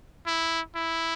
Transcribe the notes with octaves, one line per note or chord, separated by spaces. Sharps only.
E4
E4